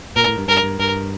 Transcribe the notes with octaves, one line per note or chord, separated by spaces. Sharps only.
A#2 A#4
A2
G2
G2 A#4
G2
G2 A#4